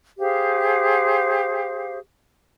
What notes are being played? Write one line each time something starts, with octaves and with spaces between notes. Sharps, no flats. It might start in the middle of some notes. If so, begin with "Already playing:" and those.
G4 G#4 C5 F5